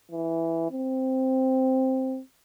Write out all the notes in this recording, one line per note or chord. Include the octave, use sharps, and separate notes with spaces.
E3
C4